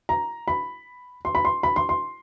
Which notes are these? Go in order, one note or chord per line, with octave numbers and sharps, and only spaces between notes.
A#5
B5
C6
B5
C6
B5
C6
C6